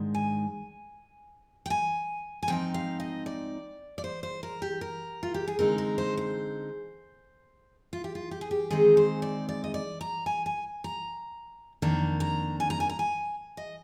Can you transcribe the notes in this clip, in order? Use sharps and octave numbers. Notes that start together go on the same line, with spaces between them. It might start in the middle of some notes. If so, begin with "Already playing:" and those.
Already playing: G#2 D#3 G#3 D4
G#5
G5
G#5
G#5
G#2 F3 C4 D#4 G5
F5
D#5
D5
D5
C5
C5
A#4
G4
A#4
F4
G4
G#4
D3 G#3 C4 D#4 A#4
A#4
C5
C5
F4
G4
F4
G4
G#4
G4
D#3 G#3 C4 D#4 G#4
C5
D5
D5
D#5
D5
A#5
G#5
G#5
A#5
F2 D#3 A#3 D4 A#5
A#5
G#5
A#5
G#5
A#5
G#5
D#5